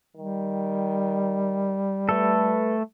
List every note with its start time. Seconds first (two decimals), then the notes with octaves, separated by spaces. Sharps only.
0.16 D#3 G3
2.09 A3 A4 B4